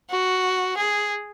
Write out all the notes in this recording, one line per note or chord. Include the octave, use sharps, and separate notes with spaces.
F#4
G#4